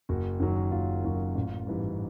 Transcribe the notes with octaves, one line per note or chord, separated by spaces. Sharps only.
F#1 F#4
F#2 D#3 F#3
F#1 F4
F#2 D#3 F#3
A1
G#2 E3 G3